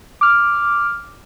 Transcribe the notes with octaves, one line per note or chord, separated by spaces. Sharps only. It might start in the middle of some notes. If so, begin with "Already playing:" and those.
D6 F6